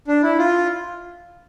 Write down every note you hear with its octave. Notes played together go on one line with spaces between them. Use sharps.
D4
E4
F4